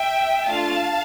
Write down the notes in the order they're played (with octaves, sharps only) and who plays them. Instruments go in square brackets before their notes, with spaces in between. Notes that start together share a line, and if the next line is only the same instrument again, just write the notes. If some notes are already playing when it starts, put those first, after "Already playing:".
Already playing: [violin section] E5 G5
A3 D4 F4 F5 A5